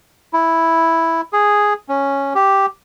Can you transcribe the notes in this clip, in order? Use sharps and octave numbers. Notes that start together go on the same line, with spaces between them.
E4
G#4
C#4
G4